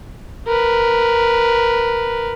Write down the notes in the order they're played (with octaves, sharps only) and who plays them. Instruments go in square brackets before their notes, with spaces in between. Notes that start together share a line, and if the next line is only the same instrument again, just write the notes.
[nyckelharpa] A#4 B4